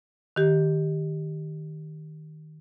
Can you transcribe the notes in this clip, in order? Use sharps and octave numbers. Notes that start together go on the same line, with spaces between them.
D#3 G4